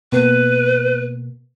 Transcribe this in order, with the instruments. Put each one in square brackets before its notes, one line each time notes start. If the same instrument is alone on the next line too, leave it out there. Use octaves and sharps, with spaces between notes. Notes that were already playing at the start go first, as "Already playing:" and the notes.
[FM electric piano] B2 A#3 B3 [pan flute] B4